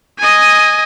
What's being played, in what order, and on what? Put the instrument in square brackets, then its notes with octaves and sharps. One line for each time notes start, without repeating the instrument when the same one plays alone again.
[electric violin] D#5 G#5